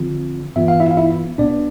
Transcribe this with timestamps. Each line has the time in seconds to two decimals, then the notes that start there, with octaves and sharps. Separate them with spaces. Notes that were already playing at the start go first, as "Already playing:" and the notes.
Already playing: D3 F3 C4 F4
0.56 G2 E3 B3 F4 E5
0.68 F5
0.80 E4 E5
0.91 F5
0.97 E4 E5
1.38 C2 B2 B3 D4 D5